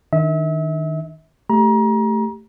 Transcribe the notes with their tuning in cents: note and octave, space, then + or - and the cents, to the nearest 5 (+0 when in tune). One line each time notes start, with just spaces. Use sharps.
D#3 +0 D4 +0 E5 -35
A3 +0 G4 +0 A#5 +30